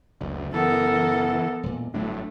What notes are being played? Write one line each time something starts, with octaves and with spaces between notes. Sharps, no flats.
F#1 D2
E3 B3 A4 A#4
E1 A#2
G1 A2 F#3 A3 D4